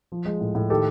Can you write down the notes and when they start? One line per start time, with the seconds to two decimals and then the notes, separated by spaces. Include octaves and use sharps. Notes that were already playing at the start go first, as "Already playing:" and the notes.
0.12 F3
0.26 G#3
0.41 A2
0.55 A2
0.70 D#3 G4 A4